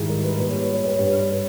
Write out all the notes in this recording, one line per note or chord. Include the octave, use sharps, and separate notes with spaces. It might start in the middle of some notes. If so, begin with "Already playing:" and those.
Already playing: G#2 D#3 G3 E4 G#4
A#4
B4
A#2 G3 B4
C#5
B4
C#5
B4
G2 G3 C#5
B4
C#5
B4